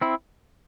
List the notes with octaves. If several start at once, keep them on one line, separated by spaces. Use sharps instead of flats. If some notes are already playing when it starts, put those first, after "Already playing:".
C4 E4